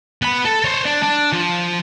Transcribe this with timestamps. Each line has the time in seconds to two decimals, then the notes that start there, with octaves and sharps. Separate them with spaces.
0.22 B3 B5
0.45 A4
0.64 C5 C#5
0.85 D4
1.03 D4
1.33 F3